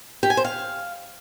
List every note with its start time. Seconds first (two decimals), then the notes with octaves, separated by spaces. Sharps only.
0.23 G4
0.30 G#5
0.37 C5
0.45 F5